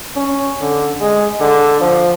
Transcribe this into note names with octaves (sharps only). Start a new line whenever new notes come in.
C#4
D3
G#3
D3
F3